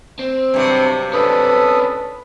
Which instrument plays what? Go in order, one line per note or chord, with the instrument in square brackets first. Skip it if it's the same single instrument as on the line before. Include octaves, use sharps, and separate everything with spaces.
[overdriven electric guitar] C4
[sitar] G2 C3 F#3
[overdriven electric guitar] C#4 D4 [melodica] A4 B5 D#6 [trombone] B4